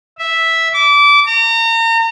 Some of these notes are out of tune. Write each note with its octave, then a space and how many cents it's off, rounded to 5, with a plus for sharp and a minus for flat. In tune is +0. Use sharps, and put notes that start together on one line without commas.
E5 -5
D6 -25
A#5 -35